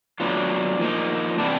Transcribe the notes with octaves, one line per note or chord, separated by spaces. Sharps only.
F#3 B3 D4 F4
F3 A#3 D#4
C3 E3 G3 B3 D4